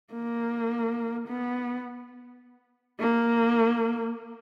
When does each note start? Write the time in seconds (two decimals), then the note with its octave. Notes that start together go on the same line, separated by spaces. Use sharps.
0.14 A#3
1.28 B3
3.00 A#3